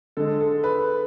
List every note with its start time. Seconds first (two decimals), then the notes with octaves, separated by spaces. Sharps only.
0.17 D3 G#3 A4
0.40 A4
0.64 B4